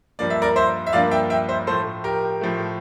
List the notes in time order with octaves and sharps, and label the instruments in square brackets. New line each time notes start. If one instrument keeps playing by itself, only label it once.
[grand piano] G2 F3 A#3 D4 D5
E5
A#4 D5
C5 E5
E5
G2 F3 A#3 D4 D5 F5
E5 G5
E5 G5
C5 E5
A2 F3 A3 A4 C5
G4 A#4
A2 F3 A3